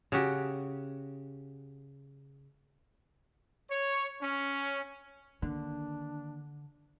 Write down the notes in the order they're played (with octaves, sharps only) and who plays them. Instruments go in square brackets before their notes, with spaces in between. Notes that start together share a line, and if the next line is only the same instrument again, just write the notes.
[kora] C#3 F#4 G4
[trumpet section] C#5
C#4
[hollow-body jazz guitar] D3 [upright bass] D#3 A#3 [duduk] D4